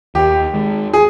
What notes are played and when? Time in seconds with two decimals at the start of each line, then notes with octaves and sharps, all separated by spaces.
0.15 D#2 G4
0.54 D#3 G#3
0.93 G#4